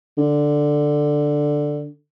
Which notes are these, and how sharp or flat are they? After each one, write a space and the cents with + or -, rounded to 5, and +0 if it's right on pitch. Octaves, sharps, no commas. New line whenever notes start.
D3 +5